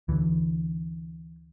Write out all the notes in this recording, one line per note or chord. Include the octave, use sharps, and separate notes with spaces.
D2 D3 E3